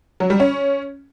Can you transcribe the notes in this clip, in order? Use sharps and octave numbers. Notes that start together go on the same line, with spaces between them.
F#3
G3
C#4